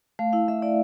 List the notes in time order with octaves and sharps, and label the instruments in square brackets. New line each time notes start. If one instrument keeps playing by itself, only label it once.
[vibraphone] A3 F5
E4 F5
A3 E5
E4 D5